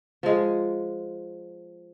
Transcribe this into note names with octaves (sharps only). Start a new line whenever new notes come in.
F3 G#3